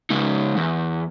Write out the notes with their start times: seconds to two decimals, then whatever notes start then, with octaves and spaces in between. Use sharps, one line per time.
0.10 C#3 G#3 D#4
0.57 E2